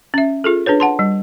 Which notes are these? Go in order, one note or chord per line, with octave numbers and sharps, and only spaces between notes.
C#4 E5
F4 G#4 A4
D4 G#4 B4 C#5
F#5 A5 C6
G3